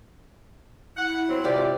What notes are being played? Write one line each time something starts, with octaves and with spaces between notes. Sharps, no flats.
E4 F#5
F#3 C4
G#2 C3 F4 G4 D5